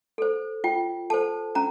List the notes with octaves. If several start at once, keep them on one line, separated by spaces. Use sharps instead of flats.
A4 C5
F4 G5
A4 C5 A5
C#4 A#5